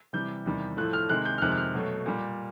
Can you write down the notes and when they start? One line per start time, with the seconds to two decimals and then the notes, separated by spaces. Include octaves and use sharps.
0.13 C3 E3 G3 G6
0.46 E2 C3 D#3 G3
0.77 A2 F3 A3 F#6
0.93 F6
1.09 C3 D#3 G#3 F#6
1.25 G6
1.38 F6
1.42 F2 C3 D#3 G#3 F#6
1.52 F#6
1.58 F6
1.74 B2 F#3 A3
2.06 A#2 G3